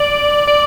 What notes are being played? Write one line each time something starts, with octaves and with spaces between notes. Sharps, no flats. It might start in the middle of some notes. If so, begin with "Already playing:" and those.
Already playing: D5
D5